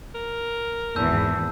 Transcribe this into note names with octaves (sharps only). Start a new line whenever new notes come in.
A#4
G#1 E2 A5 E6 G6